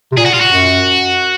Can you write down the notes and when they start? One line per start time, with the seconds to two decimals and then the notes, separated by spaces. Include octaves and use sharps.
0.12 C3
0.17 A#2 G#4
0.25 F#4
0.33 F4
0.40 F#4
0.50 F#2